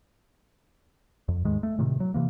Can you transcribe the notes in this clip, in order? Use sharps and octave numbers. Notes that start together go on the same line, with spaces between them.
F2
D#2 G#2 D#3 G#3
A3
A2 C3 D#3
F#3
C3 E3 A#3